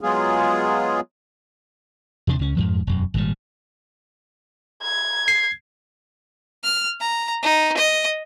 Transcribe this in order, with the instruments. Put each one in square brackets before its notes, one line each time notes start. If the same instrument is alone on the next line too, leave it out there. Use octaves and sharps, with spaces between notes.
[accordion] F#3 G#3 B3 F4 G#4
[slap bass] E2 C3 D4
C#2 C#4
F2 G#2 F3
E1 F#2
G#1 A#2 G3
[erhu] G#6
[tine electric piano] C7
[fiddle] F6
A#5
D#4
D#5